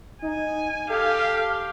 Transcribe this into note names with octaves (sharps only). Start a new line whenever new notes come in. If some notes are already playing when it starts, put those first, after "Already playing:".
D#4 G#5
G4 A4 F5